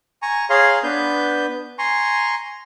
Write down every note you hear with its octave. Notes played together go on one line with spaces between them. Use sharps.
G#5 A#5 C#6
G#4 C#5 F5 A#5 C6
B3 D4 B4 G6
G#5 A#5 C6 C#6